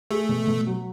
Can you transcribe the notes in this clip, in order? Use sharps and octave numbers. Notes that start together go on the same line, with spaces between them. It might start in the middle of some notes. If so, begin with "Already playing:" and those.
A3 G#4
B2
B2
F#3